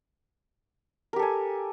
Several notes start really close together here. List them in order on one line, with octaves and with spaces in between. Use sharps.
A#4 G4 A4 G#5